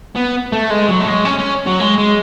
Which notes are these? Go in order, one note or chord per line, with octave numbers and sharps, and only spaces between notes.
B3
A3
G#3
F#3
A3
G#3
C#4
C#4
F#3
G#3
G#3